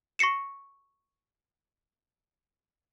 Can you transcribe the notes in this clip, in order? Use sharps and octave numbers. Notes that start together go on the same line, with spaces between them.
C#6 A#6 C7 C#7 E7